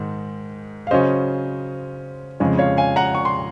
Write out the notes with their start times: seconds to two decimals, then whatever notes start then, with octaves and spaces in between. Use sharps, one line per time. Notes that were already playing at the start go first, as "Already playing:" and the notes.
Already playing: G#2 D#3 G#3
0.87 F5
0.91 C#3 F#3 C#4 C5 D#5
2.40 F2 C#3 F3 G#3 C#4
2.59 C#5 F5
2.77 F5 G#5
2.96 F#5 A#5
3.15 C#6
3.25 C6